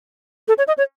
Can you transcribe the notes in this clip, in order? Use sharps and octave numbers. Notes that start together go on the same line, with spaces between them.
A4
C#5
D#5
C#5